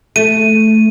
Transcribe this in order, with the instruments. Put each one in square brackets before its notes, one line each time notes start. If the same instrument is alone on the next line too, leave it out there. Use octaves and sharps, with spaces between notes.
[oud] A3 [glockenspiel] D#7